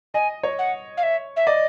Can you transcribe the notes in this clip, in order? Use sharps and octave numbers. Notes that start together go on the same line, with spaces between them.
D#5 G#5
C#5
F#5
F5
E5
E5
D5 D#5